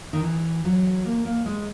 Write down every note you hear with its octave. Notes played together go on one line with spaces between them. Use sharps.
D#3
E3
F#3
A#3
A#3
G#3